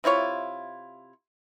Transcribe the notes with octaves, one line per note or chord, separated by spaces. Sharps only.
C3 E4 F4 C#5